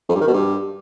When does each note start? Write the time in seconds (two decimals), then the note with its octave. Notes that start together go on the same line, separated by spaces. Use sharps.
0.09 F2
0.15 G2
0.21 D#3
0.27 B2
0.33 G2